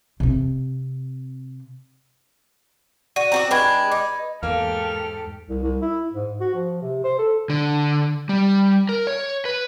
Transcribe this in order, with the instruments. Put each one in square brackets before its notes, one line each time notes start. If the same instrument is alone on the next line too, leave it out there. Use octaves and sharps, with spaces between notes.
[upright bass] C3 C4
[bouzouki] F#4 [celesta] D5 D#7
[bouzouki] C4 F#4 D5 [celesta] A#5
[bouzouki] G#3 D4 G4 [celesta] B4 B5 G#6
[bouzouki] D#4
[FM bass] E2 [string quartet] G#2 G4 A4 [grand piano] A#3 [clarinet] F6
[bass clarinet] C2
C2
E4
G#2
F#4
F3
C3
C5
A4
[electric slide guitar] D3
G3
A#4
C#5
B4